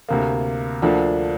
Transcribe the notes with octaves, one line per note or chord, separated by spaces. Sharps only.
D2 C3 A#3
D2 D3 F3 A#3 D4